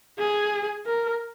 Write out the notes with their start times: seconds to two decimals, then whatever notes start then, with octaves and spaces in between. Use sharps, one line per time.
0.19 G#4
0.86 A#4